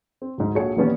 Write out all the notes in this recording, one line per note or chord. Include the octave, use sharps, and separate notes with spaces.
C4
D2 G#2
A#1 F#4 G#4 A4 C#5 C#7
D#2 A#2 E3 G3 B3 C#4